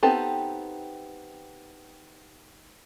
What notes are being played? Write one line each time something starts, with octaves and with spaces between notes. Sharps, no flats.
B3 C4 D#4 G4 A4